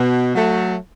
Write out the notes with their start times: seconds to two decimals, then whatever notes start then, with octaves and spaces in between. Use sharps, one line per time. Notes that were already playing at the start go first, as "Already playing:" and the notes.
Already playing: B2
0.35 F#3 A3